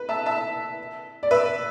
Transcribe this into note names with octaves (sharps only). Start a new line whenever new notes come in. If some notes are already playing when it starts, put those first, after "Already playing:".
Already playing: B4
E5 A5
E5 A5
D5
B4 E5